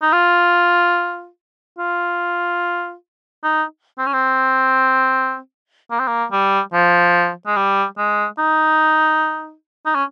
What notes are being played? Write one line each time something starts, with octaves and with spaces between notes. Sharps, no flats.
D#4
F4
F4
D#4
C4
C#4
C4
A#3
C4
A#3
G3
F3
G#3
G3
G#3
D#4
D#4
C#4